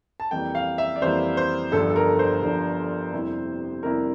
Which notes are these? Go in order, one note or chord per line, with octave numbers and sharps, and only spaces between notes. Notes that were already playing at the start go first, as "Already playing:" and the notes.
A5
F2 E3 G3 A#3 G5
F5
E5
D5
F2 E3 G3 A#3 C5
C5
G1 G2 D3 F3 A4
A4
A#4
C5
G1 G2 D3 F3
F2 C3 G3 A#3 E4
F2 C3 G3 A#3 E4 A#4